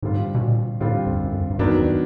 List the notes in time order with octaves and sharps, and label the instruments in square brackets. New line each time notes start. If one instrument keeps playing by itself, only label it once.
[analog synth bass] G#2 [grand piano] D3 G3 C4 F4
[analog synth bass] B2
A#2
[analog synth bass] A2 [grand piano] D3 G3 C4 F4
[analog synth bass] F2
F#2
F2
G2
[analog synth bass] F#2 [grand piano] D#3 F#3 B3 D4
[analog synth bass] F2